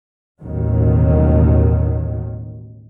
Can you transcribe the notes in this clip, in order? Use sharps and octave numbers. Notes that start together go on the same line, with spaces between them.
A1 D#2 B2 D#3 F#3